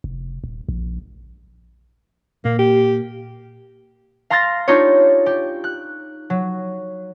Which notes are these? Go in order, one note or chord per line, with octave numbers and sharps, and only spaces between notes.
F1
D#1
A#1
A#2 A#3
G4
F5 A#5 C6 F6 A6 A#6
D4 D#4 F4 G4 C#5
G4
F#6
F#3